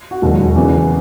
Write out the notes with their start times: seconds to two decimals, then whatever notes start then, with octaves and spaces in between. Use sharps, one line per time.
0.11 F#4
0.22 E1 D#2 D#3 F#3
0.56 E2 C#3 E3